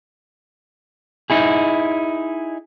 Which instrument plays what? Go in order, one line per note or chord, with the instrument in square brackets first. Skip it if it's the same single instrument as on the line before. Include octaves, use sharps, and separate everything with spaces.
[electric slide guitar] D#4 E4 G#4